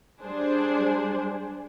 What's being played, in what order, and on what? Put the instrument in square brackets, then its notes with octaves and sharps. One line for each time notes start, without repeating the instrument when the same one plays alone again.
[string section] G3 D4 G#4 C5